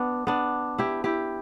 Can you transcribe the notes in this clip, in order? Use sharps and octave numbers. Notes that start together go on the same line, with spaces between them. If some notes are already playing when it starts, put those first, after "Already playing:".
Already playing: B3 D4
B3 D4
E4 G4
E4 G4